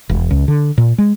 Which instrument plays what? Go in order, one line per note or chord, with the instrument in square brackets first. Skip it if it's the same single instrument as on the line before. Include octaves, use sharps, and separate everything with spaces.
[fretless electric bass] E1
C#2
D3
A#2
G#3